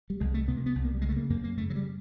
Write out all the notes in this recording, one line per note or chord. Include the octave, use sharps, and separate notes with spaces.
G3
C2 G#3
A3
C3 B3
A#3
B3
C2
A#3
G3
C#3 G#3
A3
A#3
F#2 A#3
A#3
C#3 A3
F#3
G3